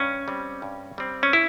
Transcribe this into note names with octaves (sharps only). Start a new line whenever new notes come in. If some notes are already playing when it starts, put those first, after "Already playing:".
Already playing: G2 C#4
G3 C4
G2
G3 C4
C#4
E4